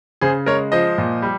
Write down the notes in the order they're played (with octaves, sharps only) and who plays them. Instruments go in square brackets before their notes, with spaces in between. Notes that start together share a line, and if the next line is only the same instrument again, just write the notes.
[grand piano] C#3 G#4 C5
G#3 A#4 C#5
F3 C5 D#5
A#2
G3